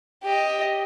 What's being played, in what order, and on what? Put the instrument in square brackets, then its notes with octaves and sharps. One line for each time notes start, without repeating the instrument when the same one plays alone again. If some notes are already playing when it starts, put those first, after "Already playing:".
[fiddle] G4 D#5